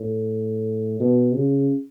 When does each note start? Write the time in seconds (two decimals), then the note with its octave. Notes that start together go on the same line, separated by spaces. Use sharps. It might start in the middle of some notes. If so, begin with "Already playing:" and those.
Already playing: A2
1.00 B2
1.34 C#3